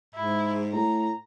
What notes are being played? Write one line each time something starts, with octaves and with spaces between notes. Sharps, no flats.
G#2 E4
A2 A#5